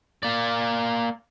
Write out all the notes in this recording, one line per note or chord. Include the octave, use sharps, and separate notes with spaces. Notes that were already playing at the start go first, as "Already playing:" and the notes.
A#3 D5